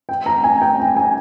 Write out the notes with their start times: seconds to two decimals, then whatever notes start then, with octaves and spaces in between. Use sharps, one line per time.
0.09 G5
0.26 A#5
0.44 G#5
0.62 G5
0.79 G5
0.97 G#5